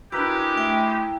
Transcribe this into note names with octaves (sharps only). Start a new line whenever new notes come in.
G#3 D4 E4 F#4 G4 A#4 B4
A3 G5